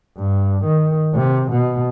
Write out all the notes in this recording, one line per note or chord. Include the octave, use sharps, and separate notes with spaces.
G2
D#3
C3
B2